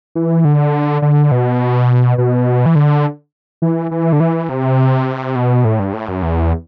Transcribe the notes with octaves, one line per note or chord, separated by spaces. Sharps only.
E3
D3
D3
B2
B2
E3
D3
E3
E3
D3
E3
C3
B2
A2
G2
A2
F#2
E2